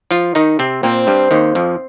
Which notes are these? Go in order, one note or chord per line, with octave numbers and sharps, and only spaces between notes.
F3 F4
D#3 D#4
C3 C4
A#2 A#3 C4
G2 G3
D#2 D#3
F2 F3